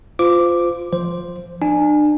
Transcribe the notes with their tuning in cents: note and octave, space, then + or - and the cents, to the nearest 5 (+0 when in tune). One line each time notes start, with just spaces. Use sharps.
F4 +0 C5 -30 D6 +0
F3 +0 C5 +0
D4 +35 G#5 +0